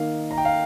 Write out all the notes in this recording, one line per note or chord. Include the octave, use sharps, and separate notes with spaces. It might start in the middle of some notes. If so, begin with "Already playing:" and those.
Already playing: D#3 A#3 D#4 F5
A#5
G5
F5